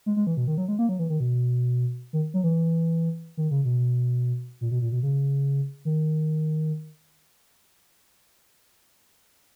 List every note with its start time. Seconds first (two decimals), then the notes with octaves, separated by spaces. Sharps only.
0.06 G#3
0.16 G#3
0.27 E3
0.37 B2
0.47 D#3
0.58 F#3
0.68 G#3
0.79 A#3
0.89 F#3
0.99 E3
1.10 D#3
1.20 B2
2.13 D#3
2.34 F#3
2.44 E3
3.37 D#3
3.51 C#3
3.65 B2
4.61 A#2
4.71 B2
4.82 A#2
4.92 B2
5.03 C#3
5.85 D#3